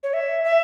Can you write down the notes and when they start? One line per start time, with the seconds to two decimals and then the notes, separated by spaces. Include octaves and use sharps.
0.03 C#5
0.14 E5
0.44 E5